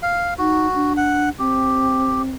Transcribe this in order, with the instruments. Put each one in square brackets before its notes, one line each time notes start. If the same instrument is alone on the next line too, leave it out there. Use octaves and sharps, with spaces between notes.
[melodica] F5
[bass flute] D#4 [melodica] F#4
[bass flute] D4
[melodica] F#5
[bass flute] C4 [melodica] G4